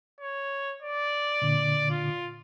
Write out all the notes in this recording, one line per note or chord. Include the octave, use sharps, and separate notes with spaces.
C#5
D5
A#2 D3
F4